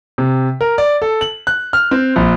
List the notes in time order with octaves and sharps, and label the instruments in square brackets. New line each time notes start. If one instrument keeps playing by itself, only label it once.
[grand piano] C3
A#4
D5
A4
F#7
F#6
F6
C4
A#1